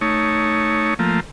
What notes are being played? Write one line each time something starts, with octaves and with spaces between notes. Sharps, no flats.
A3 D#4 C#5
F3 A3 A#3